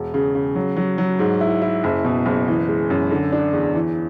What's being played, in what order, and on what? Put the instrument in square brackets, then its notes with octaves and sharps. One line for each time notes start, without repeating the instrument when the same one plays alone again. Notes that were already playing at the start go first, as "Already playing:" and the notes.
Already playing: [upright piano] E1
C#3
C#3
F#3
F#3
F#3
G#2
E4
E4
F#1
B2
F#1
E3
G#3
F#2
D3
D4
E2
E3